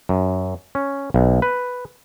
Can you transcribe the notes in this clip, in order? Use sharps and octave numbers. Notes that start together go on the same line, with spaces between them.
F#2
C#4
B1
B4